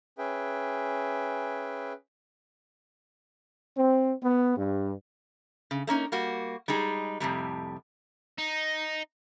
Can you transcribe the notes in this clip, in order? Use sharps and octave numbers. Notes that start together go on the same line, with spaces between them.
C#4 G#4 B4 E5 G5
C4
B3
G2
C#3
A3 A#3 C#4 D#4
G3 A#3 F#4
G3 G#3 D#4 G#4
F2 A2 C3 G3
D#4